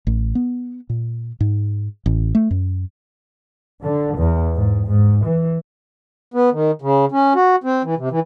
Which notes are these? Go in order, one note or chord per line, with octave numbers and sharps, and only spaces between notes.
A1
B3
A#2
G#2
A1
A3
F#2
D3
E2
G#2
G#2
E3
B3
D#3
C#3
C#4
F#4
C4
E3
C3
E3